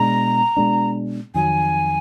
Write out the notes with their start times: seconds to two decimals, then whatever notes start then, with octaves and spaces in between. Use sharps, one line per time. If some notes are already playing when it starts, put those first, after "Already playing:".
Already playing: B2 G#3 D4 A#5
0.57 B2 G#3 D4
1.34 F2 D#3 F#3 G#5